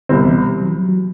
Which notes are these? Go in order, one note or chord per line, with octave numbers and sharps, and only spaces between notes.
C2 B2 D3 G3 C4
E3
F#3
E3
F#3
F#3